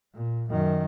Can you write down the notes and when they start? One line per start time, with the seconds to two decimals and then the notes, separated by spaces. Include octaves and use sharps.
0.14 A#2
0.51 F#2 D#3